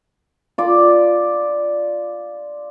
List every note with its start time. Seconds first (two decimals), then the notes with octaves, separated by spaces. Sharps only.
0.58 F4 D5